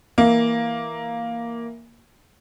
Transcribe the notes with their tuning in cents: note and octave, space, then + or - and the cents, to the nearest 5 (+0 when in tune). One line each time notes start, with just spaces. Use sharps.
E3 +0 A#3 +0 E5 +0